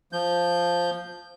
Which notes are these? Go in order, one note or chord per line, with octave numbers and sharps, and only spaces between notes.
F3 G6